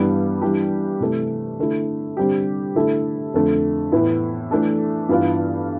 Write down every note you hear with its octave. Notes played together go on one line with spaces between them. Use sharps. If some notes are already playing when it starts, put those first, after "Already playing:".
Already playing: G2 E3 G3 B3
E3 G3 D4 G4
C3 E3 A3
D3 A3 E4
D3 G3 C4 G4
D3 A3 E4 A4
F2 D3 A3
A2 E3 B3 E4
E3 A3 D4 A4
G2 E3 B3 F4